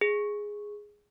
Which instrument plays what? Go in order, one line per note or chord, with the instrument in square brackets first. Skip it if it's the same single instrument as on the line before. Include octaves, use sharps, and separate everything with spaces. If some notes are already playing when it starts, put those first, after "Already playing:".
[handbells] G#4